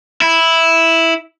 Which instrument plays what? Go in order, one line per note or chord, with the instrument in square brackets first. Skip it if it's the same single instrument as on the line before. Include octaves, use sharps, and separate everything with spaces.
[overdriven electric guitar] E4